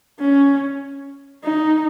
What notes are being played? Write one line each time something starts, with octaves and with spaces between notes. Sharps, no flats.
C#4
D#4